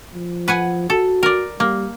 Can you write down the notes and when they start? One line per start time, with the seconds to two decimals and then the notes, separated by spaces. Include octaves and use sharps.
0.14 F3
0.48 B4 F#5 G#5
0.90 F#4 A4
1.23 A#4 D5
1.60 G3 A#3